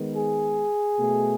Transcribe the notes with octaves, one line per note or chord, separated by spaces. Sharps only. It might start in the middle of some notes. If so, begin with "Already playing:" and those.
Already playing: D#3 G#3 B3
G#4
B2 A3